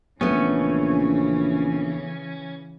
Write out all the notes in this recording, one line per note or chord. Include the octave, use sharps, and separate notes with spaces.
A#1 C#3 E3 A3 B3 C#4